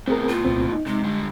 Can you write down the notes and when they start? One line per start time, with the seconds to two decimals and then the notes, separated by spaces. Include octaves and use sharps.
0.08 A2 B3 C4 G#4 A#4
0.29 F4
0.45 C2 A#2 C4
0.72 D#4
0.87 C3 G#3
1.04 D3 G3